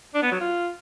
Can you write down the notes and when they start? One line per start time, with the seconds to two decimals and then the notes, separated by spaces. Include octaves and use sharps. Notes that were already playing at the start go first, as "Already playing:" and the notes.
0.14 D4
0.23 B3
0.31 F#3
0.40 F4